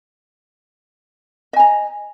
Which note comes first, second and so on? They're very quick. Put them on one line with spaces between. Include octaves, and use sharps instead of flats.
D#5 G#5 A#5